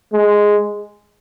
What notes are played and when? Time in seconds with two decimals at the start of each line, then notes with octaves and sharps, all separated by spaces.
0.13 G#3